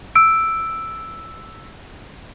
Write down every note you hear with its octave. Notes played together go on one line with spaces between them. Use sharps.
E6 D7